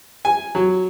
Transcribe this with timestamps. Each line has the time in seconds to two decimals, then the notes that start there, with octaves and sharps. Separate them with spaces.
0.25 G#5
0.55 F#3